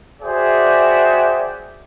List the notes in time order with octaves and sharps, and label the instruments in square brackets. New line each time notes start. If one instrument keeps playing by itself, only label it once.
[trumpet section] F#4 G#4 C5 D5 E5 G5